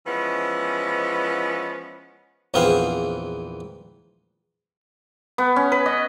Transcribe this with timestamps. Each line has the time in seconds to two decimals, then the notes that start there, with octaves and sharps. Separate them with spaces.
0.06 E3 F3 G#3 B3 C#4
2.54 A#1 E2 B3 C4 G#4 F5
5.38 B3
5.56 C#4
5.72 B4
5.86 D#5